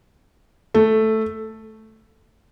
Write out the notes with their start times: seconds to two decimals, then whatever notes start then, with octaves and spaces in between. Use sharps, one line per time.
0.74 A3